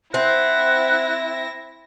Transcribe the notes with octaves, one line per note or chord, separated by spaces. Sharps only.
C4 E4 E5 F#5 A#6